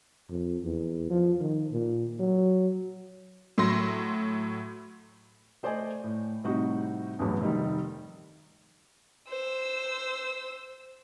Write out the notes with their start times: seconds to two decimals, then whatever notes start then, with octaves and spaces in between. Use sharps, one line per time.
0.30 F2
0.64 E2
1.10 F3
1.40 D#3
1.72 A#2
2.19 F#3
3.58 A2 F#3 C6 A#6
5.63 A3 C5 D5 D#5 G#5
6.04 A2
6.44 A2 C3 G3 C4 D#4 F#4
7.19 A1 E2 G2 F#3
7.41 F1 D#3 G3
9.29 C5 E6